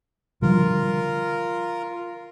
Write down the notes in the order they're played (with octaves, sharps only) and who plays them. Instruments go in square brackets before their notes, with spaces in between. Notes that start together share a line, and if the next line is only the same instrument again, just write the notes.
[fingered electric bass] D3 F3 G3 [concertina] F4 A#4